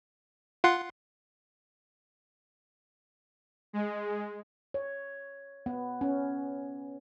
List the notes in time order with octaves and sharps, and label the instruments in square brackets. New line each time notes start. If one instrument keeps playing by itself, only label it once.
[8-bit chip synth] F4 F#5 C6
[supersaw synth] G#3
[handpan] C#5
B3
C#4